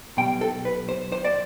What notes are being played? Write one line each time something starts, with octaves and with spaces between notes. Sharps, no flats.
B1 B2 G3 G5
A4
B4
C5
C5
D5